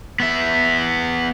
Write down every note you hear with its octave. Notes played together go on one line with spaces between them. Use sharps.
B3 E5